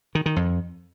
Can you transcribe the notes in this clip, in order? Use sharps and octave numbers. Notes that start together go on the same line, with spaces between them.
D#3
D#3
F2